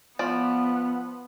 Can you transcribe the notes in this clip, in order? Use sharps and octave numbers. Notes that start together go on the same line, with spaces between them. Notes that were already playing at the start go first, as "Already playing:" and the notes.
F3 B3 D5